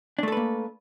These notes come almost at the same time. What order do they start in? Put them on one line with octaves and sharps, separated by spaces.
D4 A3 A4 B4 A#3